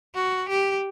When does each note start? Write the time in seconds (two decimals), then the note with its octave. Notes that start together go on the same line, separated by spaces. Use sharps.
0.15 F#4
0.49 G4